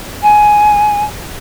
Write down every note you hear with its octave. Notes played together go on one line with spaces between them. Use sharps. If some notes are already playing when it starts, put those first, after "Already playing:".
G#5